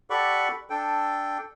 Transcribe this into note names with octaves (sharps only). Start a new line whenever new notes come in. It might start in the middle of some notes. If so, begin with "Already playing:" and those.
G4 A4 D5 F#5 B5 C#6
D4 A4 G5